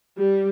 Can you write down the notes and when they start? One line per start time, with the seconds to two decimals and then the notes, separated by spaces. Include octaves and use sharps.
0.18 G3